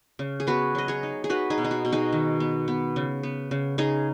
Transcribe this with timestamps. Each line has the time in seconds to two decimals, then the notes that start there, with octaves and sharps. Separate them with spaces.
0.19 C#3
0.40 G#4
0.47 B3 F#4 B4
0.75 F#3 D#5
0.88 G#4 C#5
1.03 D#4
1.24 G#4
1.29 D#4 F#4 B4
1.50 D#4 G#4
1.58 B2
1.64 D#4
1.71 F#4
1.85 B2
1.92 D#4 G#4
2.12 D#3
2.40 B3
2.68 B3
2.96 C#3
3.23 B3
3.51 C#3
3.78 C#3 D#4 G#4